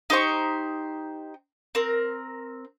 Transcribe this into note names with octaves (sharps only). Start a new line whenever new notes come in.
D#4 G4 C5 C#6
C4 A#4